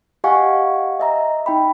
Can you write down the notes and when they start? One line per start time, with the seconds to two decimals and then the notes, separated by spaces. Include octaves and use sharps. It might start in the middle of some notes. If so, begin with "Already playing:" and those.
0.24 G4 D#5 F5 F#5 G#5 C#6
1.00 D#5 E5 A#5
1.46 D#4 G5 B5